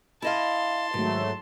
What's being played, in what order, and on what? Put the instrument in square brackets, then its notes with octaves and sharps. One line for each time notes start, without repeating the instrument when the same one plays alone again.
[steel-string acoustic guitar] E4 D#5 F5 [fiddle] A5 C6
[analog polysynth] G#2 F#3 A3 [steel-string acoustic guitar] D#3